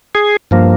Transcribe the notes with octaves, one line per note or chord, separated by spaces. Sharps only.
G#4
G2 F3 A#3